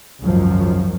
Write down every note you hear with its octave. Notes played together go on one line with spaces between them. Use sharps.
G#1 C#2 F#2 D#3 F3 F#3